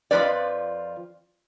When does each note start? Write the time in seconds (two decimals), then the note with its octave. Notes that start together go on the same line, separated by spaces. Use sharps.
0.11 F2 F3 G#3 B4 D5